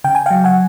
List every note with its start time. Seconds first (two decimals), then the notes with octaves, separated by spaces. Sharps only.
0.04 C#3 G5
0.15 G#5
0.26 F#3 F5 G5
0.44 F#5 G#5